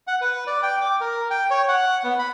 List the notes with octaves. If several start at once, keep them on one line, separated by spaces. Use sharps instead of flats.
F#5
B4
D5
G5
D6
A#4
G5
C#5
F#5
B3
B5